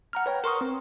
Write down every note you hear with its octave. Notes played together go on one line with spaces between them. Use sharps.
F#5 A#5 F6
B4 C#5 G5 A#5
A#4 C6 C#6 D#6
C4